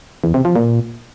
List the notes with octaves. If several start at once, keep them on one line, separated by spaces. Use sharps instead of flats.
E2
C3
F3
A#2